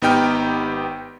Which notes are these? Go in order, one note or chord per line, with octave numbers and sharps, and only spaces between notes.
G#1 B3 D#4 G4 G5 F6